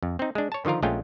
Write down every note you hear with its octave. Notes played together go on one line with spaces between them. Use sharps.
F2
C4 D#4
G#3 D4
C#5 A5
D3 D#3 F3 F4 A#4
A#1 G#3 A3 C#4 F4 G5